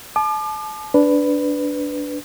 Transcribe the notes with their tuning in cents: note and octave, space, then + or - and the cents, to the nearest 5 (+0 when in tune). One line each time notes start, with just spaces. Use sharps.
A5 -35 D6 +40
D4 -10 B4 +10